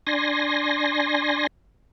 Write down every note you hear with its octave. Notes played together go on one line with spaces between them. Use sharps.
D4 G#5 C6 A#6